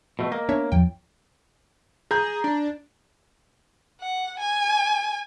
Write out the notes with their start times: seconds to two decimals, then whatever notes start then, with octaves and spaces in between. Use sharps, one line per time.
0.19 B2 A3
0.32 A#3 D#5
0.49 B3 D4 C#5 E5
0.72 E2 F3 G5
2.11 G#4 A#5 G6
2.44 D4
4.00 F#5
4.39 G#5